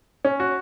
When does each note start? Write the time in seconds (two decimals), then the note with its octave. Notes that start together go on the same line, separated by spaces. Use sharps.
0.25 C#4
0.40 F#4